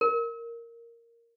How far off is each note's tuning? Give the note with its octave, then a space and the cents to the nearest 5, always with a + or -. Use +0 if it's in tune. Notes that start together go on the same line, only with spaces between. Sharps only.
A#4 -5